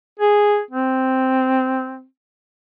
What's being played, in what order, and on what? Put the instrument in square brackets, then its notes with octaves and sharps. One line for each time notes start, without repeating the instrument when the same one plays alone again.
[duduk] G#4
C4